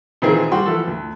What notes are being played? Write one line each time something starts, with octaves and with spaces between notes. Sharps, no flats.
A#2 D#3 E3 C4 G#4
G3 F#4 G5 C6
E3 F3 A4
D2